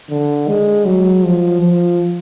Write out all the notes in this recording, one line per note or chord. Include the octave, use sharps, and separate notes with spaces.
D3
G#3
F#3
F3
F3